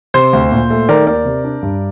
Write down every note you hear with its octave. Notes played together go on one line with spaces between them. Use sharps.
C3 C5
D2
A#2
A3
D#3 A#4 D5
D#2 A#4 D5
C3
D4
G2